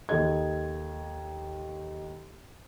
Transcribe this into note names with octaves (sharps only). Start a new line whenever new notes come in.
D#2 A4 D#5 G#6